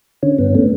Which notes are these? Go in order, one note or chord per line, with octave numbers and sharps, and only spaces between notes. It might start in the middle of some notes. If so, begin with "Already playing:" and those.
D3 C#4
G2 B3
A3 C#4